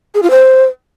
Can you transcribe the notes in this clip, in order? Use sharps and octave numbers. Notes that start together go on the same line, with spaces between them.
G#4
F4
C5